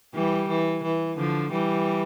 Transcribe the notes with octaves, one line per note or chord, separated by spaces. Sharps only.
E3 G3
E3
E3
D3 F3
E3 G3